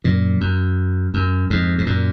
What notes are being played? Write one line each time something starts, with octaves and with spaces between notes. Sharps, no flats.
F#2 A#2
F#2
F#2
F2 G#2
G#2
F#2 A#2